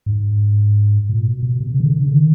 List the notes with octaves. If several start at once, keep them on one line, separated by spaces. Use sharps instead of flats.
G#2
A#2
B2
B2
C3
C#3
D#3
D3
C#3
D#3